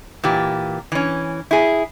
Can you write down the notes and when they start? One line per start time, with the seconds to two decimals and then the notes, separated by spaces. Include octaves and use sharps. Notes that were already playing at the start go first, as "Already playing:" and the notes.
0.24 A#2 E3 G4
0.92 E3 C#4
1.51 E4 G#4